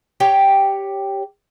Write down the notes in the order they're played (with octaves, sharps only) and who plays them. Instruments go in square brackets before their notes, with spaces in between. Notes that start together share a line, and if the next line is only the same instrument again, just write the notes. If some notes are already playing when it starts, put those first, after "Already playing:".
[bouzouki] G4 C#5 G5